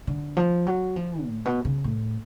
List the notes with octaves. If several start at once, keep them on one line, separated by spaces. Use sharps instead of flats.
D3
F3
F#3
F3
A2
B2
C#3
A2